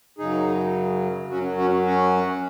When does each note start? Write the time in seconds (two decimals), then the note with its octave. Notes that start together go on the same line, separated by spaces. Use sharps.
0.19 F#2 C#3 F#3 D#4 G#4
1.31 F#2 F#3 C#4 F#4
1.58 C#4 F#4
1.86 C#4 F#4